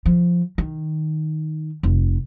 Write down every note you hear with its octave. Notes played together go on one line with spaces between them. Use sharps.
F3
D#3
F1